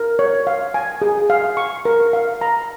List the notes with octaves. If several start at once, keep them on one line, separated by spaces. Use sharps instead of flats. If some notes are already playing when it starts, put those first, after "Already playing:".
Already playing: A#4
C#5
F5
G#5
G#4
F5
C#6
A#4
F5
A#5